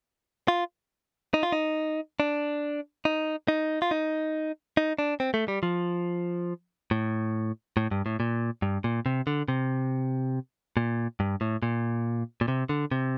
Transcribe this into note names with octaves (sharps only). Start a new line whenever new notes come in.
F4
D#4
F4
D#4
D4
D#4
D#4
F4
D#4
D#4
D4
C4
A3
G3
F3
A2
A2
G2
A2
A#2
G2
A#2
C3
D3
C3
A#2
G2
A2
A#2
A#2
C3
D3
C3